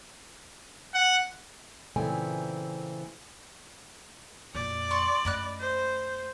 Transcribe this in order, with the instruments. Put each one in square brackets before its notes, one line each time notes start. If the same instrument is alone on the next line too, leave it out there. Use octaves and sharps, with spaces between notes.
[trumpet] F#5
[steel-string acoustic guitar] A#2 C#3 E3 A3 C4 G#5
[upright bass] F2 A#2 [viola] D5
[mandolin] C6 C#6
[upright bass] F#2 A3 [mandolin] D#5 B5 F#6
[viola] C5